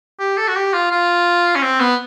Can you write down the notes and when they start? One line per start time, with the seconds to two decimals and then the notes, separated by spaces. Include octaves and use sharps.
0.19 G4
0.37 A4
0.48 F#4
0.56 G4
0.73 F4
0.91 F4
1.55 C#4
1.63 C4
1.80 B3